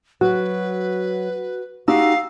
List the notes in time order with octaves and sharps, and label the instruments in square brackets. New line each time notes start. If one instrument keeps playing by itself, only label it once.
[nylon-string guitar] F#3 [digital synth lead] F#4 [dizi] B4
[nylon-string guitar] D#4 F#4 G4 [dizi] F5 [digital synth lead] E6